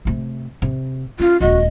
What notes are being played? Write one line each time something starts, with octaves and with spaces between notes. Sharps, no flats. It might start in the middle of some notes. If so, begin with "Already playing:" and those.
C3 A3
C3
C#4 F4
D#1 C#2 F#4 D#5